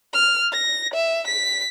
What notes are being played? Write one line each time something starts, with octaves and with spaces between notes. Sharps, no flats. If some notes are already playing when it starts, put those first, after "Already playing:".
F6
A#6
E5
B6